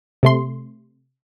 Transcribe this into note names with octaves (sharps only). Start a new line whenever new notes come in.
C3 A3 C6